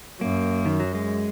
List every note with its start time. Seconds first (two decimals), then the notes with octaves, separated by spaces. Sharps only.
0.21 F#2 A#3
0.66 D#3
0.80 F#3
0.95 G#3